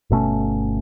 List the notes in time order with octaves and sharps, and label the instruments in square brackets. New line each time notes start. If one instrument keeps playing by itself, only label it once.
[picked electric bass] G1 B2 A3 C#4